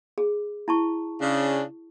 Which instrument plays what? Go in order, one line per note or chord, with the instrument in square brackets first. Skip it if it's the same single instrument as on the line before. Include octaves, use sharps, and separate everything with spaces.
[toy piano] G#4
E4 A5 C#6
[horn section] C#3 D4